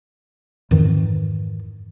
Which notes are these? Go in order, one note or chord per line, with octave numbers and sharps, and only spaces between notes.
F2 G#2 D#3 E3